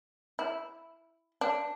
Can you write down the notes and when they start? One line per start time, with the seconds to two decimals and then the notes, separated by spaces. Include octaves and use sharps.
0.39 E4
1.41 D4